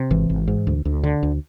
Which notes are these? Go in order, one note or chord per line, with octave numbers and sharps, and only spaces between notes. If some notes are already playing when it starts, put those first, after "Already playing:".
Already playing: C3
G#1 E3
G#1
G#2
D2
D2
D3
D2